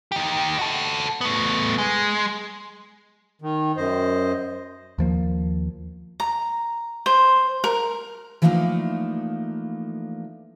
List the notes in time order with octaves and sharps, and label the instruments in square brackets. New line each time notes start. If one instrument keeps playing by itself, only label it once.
[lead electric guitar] D#4 G4
F#4 A4
A3 B3
G#3
[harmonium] D#3
F#2 C5 D#5
[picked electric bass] D#2 F3 A#3
[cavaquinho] A#5
C5
A#4
[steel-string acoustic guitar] E3 F3 A3 A#3 D4 D#4